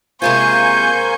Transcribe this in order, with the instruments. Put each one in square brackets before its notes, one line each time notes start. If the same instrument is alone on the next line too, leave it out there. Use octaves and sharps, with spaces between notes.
[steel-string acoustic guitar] C3 G#3 F4 [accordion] A#3 G#5 G6 [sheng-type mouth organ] C5 [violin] C#6